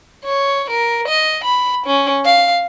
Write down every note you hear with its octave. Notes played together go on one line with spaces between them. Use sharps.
C#5
A#4
D#5
B5
C#4
F5